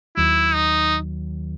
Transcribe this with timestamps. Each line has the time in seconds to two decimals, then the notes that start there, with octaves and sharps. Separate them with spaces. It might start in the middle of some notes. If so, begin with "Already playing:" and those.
0.17 D#2 D#3 F#3 E4
0.55 D#4